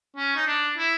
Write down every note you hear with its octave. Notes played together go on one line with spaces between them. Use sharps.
C#4
D#4
D4
E4